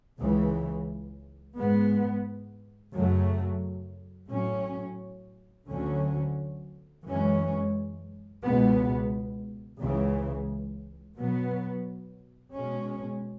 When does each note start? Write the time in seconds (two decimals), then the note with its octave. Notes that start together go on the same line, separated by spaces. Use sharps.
0.19 C#2 C#3 E3
1.57 G#2 G#3 B3
2.94 F#2 C#3 F#3 A3
4.31 A2 F#3 C#4
5.69 D2 D3 F#3 C#4
7.05 F#2 E3 G#3 C#4
8.43 C#2 B2 G#3 B3
9.80 C#2 C#3 E3
11.17 B2 F#3 B3
12.54 B2 G#3 C#4